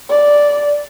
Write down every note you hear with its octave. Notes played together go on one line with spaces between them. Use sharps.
D5